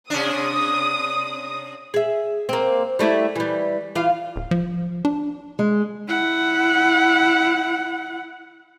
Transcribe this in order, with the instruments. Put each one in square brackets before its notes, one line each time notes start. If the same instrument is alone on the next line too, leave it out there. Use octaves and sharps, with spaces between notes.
[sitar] C3 C#4 D4 [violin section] D#6
[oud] G#4 E5
A#3 C4
G3 A3 E4
E3 G3
E3 F4 F5
[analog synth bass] D1
F3
D4
[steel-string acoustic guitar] G#3
[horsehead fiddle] E4 F#5